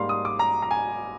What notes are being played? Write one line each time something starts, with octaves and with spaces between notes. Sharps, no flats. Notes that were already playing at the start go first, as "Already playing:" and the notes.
Already playing: G#2 G3 A#3 F5 C6
D#6
D6
A#5
A#5
G#5